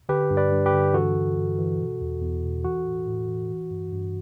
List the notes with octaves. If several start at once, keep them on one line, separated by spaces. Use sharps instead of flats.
D3 G4 B4
G2
B4 D5
G2
G4 B4
D3
E3 F#4 A4
G2
G2
E3
B2
E2
E2
B2
E3 F#4
A2
A2
E3
E3
G2
G2